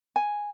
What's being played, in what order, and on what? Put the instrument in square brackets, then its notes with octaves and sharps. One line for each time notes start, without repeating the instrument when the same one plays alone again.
[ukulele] G#5